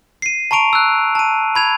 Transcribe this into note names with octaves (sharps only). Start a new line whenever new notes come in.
C7 D#7
A5 A#5 C#6 D7 F7
E6 F#6
A5 D#7
B5 G#6 F7